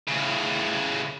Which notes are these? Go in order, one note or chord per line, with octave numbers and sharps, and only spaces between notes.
A2 C#3